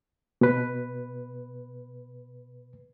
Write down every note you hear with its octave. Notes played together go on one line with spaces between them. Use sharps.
B2 B4